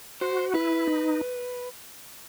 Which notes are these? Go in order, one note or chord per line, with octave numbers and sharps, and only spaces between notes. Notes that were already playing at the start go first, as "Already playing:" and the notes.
F#4 C5
E4 B4
D#4